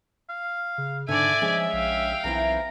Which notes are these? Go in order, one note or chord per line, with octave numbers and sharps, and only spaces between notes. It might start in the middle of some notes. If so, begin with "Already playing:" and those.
F5
C#3
G#2 D3 D5 E5 G#5
F3 G#3 C#4
A#1 F5 G5
B1 E3 C4 E4 A#5